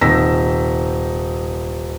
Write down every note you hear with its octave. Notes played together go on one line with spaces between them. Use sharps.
D#1 C3 D#4 E6 A#6 B6